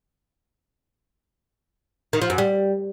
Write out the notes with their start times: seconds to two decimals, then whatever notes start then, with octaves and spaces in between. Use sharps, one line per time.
2.13 D#3
2.22 F3
2.30 F#2
2.38 G3